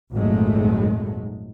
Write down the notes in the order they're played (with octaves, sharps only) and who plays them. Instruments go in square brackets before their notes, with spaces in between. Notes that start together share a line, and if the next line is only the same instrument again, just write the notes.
[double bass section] G#1 F2 A#2 F#3 G#3 A3